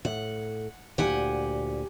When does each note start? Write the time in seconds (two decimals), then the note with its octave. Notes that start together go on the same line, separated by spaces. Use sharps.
0.05 A2 F#5
0.98 D2 A#2 G4 F#5 G#5